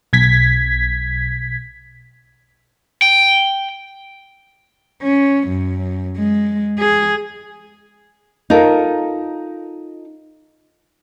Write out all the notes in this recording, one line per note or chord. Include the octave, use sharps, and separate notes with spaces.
B1 G#6 B6
G5
C#4
F#2
G#3
G#4
D#4 F4 A4 A#4